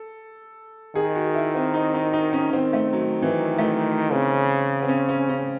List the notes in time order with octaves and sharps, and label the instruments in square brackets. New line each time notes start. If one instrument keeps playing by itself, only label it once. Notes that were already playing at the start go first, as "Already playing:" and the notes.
Already playing: [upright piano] A4
[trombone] D#3 [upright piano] G#4
[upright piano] F#4
E4
C4
D#4
D#4
D#4
C#4
[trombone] D#3 [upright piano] C4
[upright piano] A3
F#3
E3
F#3
A3
[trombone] C#3 [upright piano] C4
[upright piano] C4
C#4
C#4
C#4